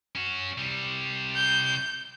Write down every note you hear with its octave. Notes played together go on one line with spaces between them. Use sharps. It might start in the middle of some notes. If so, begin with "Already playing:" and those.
C#4 F#4
C3 G3
G6